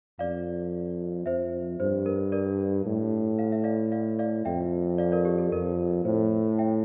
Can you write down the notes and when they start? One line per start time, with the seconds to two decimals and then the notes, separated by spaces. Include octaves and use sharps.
0.19 F2 D5 F5
1.26 F2 C5 E5
1.80 G2 C5
2.06 A#4
2.32 A#4 D5
2.86 A2
3.39 F5
3.52 E5
3.64 D5 F5
3.92 D5 F5
4.19 D5 F5
4.45 F2 E5 G5
4.98 D5 F5
5.12 A#4 D5
5.25 G4
5.38 A4
5.52 F2 A#4
6.05 A2 C5
6.59 E5 G5